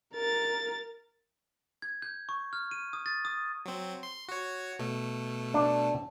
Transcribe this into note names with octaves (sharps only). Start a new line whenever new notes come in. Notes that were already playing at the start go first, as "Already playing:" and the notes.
A#4 A6
G#6
G6
C#6
F6
D#7
D#6
A6
D#6
F#3 C4
C6
F#4 C#5
B2 A3
D4